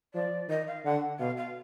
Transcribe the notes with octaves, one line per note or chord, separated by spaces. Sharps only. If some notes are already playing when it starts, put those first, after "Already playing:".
F3 D5
D#3 D#5
F5
D3 F#5
B2 F5
F5